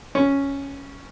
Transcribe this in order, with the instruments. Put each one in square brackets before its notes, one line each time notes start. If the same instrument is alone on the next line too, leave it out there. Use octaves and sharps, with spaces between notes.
[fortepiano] C#4